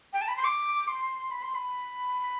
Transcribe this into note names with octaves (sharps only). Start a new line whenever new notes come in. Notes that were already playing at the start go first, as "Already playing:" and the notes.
G5
A5
B5
C6
D6
C6
B5
C6
B5